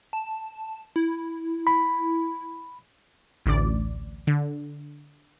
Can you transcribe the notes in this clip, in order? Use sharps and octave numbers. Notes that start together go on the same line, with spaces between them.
A5
E4
B5
A1 D2 D5
D3